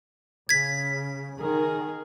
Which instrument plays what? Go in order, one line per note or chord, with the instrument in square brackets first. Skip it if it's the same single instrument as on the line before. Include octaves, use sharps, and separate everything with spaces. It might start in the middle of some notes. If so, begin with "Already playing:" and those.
[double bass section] C#3 [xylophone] G#6 B6
[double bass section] D#3 [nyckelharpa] G#4 A#4